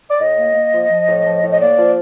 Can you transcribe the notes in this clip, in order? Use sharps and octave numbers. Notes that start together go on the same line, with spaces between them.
D5
A2 D#5
A#3
A#3
F3
F3
A2
F3
A2
D#5
A#3 D5
F3